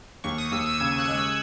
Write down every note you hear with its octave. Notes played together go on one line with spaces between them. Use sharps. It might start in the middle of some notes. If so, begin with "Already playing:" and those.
D#2 C#6
D#6
D#2 E6
E6
C#3 G#6
F#6
G#3
E6